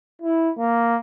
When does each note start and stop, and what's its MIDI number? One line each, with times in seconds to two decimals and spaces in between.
0.22 0.51 64
0.59 0.99 58